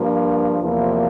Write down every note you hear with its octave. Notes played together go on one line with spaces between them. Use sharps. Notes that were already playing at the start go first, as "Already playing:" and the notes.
Already playing: G2 F3 A#3
E2 C3 F3 A#3 E4